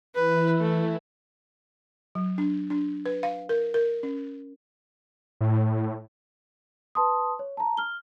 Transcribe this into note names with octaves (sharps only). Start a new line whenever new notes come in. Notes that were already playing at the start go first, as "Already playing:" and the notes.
E3 E4 B4
A3
F#3
D4
D4
B4
F5
A#4
A#4
C#4
A2
B4 A5 C6 D#6
C#5
A5 A#5
F6 G7